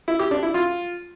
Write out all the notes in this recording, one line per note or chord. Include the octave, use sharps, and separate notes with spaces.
E4
G4
D4
E4
F4